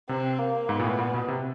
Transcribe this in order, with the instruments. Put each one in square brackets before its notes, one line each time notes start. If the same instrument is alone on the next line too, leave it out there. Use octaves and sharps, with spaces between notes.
[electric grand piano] C3 [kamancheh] C4
[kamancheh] A#3
[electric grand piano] G#2 [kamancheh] B3
[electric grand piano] A#2
A2
A#2
B2
C3